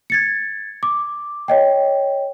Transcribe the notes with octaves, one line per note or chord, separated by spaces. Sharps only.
G#6 A6 C#7
D6
C#5 D#5 G5